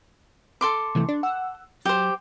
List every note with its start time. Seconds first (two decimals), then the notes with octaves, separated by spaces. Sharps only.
0.61 A4 C6 D6
0.95 C3 E3 A3
1.09 D4
1.23 F#5 E6
1.85 F#3 G4 C5